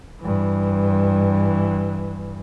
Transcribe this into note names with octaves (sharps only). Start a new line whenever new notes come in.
G2 E3